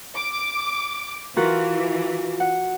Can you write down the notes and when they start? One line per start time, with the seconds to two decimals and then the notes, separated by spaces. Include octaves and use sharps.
0.16 D6
1.37 E3 F4 F#4 A#4
2.40 F#5